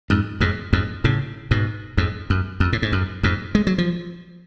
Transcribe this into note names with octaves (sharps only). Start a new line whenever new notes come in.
F2 G#2
F2 G#2
F2 G#2
A2 C#3
G#2 B2
F2 G#2
F#2
F2
A2
G#2
F#2
F2 G#2
G#3
F#3
F3